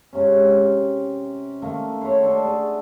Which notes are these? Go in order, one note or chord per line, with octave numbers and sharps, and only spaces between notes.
G#2 C3 C#4
G5
D#3 A3 A#3
C#5 E5 F#5 C6
D4 A4
G#4